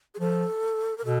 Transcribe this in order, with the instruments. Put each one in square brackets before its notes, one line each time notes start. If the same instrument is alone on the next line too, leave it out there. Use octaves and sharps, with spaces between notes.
[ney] G#4
[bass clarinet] F3 [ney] A4
[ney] A#4
[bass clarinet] B2 [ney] A4